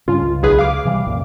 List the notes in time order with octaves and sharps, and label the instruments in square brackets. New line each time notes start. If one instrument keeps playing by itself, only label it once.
[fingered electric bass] G2 C#3 [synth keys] F4
[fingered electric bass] C#2
[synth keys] B1 G#4 B4
F5 D6
[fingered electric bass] C3 E3 G3
C2 F#2 A#2